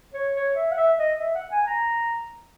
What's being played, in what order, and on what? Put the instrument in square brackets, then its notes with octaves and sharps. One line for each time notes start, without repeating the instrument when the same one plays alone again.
[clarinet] C#5
C#5
E5
F#5
E5
D#5
E5
F#5
G#5
A#5